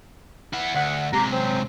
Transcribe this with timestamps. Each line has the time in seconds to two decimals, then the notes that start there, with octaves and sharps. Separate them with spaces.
0.53 E4 F#5
0.74 D2 F#5
1.13 C3 G#3 G4 A#5
1.31 F#3 C4